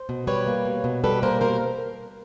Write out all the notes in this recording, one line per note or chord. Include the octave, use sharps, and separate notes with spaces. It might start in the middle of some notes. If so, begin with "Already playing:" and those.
Already playing: C5
B2
G3 B4 C#5
A#3
B2
B2
G3 A4 B4
A#3 A#4 C5
B2 A#4 C5